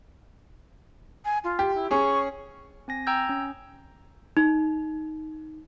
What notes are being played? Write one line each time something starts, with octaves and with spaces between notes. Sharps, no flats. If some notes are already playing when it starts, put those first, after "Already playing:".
G#5
F4
G4
E4
C#4 G#4 C#6
C4 G#5 A#6
G5 A#5 E6 G6 G#6
C#4
D#4